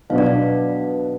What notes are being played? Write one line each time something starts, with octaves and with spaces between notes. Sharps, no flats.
B2 F#3 B3 D4 F#4 F5
D5
F5